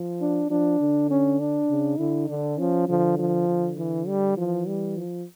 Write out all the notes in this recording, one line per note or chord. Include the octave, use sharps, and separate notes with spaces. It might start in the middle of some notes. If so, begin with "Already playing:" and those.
Already playing: F3
D4
F3 D4
D3
C#4
D4
C#3
D3 E4
D3 D4
F3 C#4
D3 F3
F3
D3
E3
G3
E3 F3
G3
F3